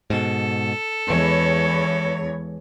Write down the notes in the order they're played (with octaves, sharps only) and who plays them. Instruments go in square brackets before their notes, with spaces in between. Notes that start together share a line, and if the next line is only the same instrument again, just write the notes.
[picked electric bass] G#2 B2 [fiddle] A4
[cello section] E2 C#5 [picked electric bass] E3 G#3